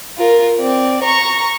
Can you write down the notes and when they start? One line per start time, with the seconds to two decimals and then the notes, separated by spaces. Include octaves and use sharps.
0.18 F4 A#4
0.59 C4 D5
1.04 A#5 C#6